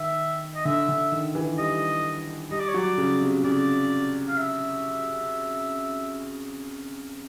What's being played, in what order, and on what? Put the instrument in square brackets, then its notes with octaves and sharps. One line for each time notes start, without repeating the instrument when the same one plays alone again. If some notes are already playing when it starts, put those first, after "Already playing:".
Already playing: [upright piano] D#3 [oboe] E5
[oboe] D#5
[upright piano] D3 [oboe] E5
[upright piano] D3
D#3
E3
[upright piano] G3 [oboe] D#5
[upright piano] G3 [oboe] D#5
[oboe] D5
C#5
[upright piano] F#3 [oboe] D5
[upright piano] C#3
C3
[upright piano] C#3 [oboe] D5
[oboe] F5
E5